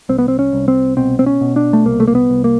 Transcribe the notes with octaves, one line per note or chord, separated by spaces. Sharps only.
C2 C4
B3
C4
C#4
C2
C4
B2 C4
C4
C#4
B2
D4
A3
C2 A#3
A3
A#3
B3
C2
A#3